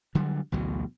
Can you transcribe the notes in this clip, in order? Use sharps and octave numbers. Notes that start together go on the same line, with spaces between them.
D3 F#3 G3
A1 D2 B2 F#3